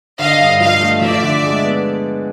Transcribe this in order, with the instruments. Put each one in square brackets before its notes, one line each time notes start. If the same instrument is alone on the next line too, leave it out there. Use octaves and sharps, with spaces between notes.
[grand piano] D3 [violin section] D#5 F5
[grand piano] G2
[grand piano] F3 [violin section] D#5 F5
[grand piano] A3
[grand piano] F3 [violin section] D5 E5
[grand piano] D3
G#3
B3